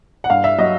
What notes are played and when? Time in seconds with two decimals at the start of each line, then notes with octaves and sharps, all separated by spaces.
0.24 F#5
0.30 G2 F5
0.44 E5
0.58 F#3 D#5